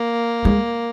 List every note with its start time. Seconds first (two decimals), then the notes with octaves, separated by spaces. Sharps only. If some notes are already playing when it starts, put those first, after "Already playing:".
Already playing: A#3
0.45 G#3